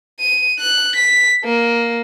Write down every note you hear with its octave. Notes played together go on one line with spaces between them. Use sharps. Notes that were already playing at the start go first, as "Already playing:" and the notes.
D#7
F#6
B6
A#3